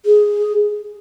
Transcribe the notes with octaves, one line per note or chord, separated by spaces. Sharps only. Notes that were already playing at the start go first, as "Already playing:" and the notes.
G#4